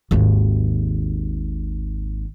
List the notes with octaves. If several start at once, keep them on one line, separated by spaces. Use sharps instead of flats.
G#1 D#2